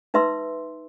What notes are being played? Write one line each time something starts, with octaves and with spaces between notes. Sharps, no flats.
D#4 B4 E5 C6 E6